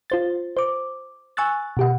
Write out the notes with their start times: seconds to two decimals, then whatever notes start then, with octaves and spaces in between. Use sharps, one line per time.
0.10 F4 C5 A6
0.57 C5 D6
1.37 G#5 C#6 E6 F#6 A6
1.77 B2 G4 F#5